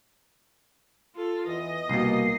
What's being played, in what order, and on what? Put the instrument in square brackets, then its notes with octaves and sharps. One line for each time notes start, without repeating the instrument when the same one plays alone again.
[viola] F4 A4
[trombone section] E2 E3 [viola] D#5
[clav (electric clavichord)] C2 B2 [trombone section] A#3 [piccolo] C7